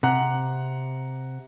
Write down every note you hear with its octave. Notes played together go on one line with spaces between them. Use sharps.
C3 F#5 A#5 F#6